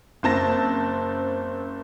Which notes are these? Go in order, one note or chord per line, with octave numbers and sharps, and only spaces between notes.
F#1 C4 A5 A#6